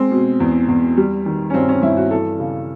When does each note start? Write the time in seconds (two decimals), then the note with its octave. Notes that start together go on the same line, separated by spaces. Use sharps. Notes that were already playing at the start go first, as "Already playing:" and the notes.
Already playing: G#3 C4
0.11 B2
0.40 E2
0.68 E2
0.97 G3
1.26 D#3
1.50 C#4
1.54 G2 C4
1.69 C#4
1.82 G2 E4
1.97 F#4
2.11 E3 A4
2.39 C#3